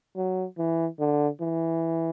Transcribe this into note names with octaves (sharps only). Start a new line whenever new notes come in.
F#3
E3
D3
E3